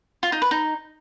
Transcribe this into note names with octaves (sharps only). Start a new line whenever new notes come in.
F4
D#4
B4
D#4